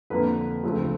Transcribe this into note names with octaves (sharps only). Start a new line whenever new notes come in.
F2 D3 F3 A#3 B4
D2 C#3 F3 A3 C4